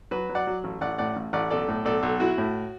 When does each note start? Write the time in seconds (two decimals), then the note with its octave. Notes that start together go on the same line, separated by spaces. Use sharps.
0.11 F#3 F#4 B4
0.29 F#3
0.35 D5 F#5
0.47 F#3
0.64 A1
0.81 A1 D5 F#5
0.98 A2 D5 F#5
1.16 A1
1.33 A1 D5 F#5
1.50 B1 A4 D5
1.68 A2
1.85 B1 A4 D5
2.03 B1
2.20 E4 F#4
2.38 A2